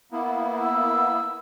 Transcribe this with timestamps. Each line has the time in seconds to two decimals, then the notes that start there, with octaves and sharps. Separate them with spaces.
0.12 A#3 B3 E4
0.62 E6